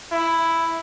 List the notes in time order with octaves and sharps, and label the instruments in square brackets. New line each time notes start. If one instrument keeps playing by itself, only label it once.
[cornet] E4